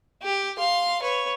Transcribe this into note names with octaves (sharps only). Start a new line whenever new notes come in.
G4
F5 C6
B4 C#5